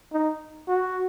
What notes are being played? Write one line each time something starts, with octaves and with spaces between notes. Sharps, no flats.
D#4
F#4